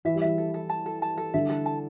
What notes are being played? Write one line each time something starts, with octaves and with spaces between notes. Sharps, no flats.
E3 E5
G3
E3 E5
A4
A4
A5
A4
A5
A4
D3 G3 E5
A4
A5